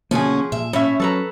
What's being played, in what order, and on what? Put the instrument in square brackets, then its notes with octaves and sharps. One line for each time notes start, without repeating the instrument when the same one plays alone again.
[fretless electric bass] B2 D3 A#3 [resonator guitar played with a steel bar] F3 G#4 [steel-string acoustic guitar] C#4 F#4
[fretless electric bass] A#2 [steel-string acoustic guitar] E5
[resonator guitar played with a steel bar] A2 E5 [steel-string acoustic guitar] C#4
[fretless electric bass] F#3 [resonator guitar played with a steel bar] A4 B4 A#5